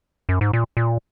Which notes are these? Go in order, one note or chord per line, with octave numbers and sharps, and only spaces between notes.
F#2
G#2
A#2
A#2